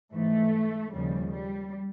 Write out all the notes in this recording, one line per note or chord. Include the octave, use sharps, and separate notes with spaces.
G#2 E3 A3
D#2 C#3 F3 G3
G3